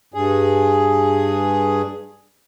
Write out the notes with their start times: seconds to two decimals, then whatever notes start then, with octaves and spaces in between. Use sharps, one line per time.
0.14 G2 G#4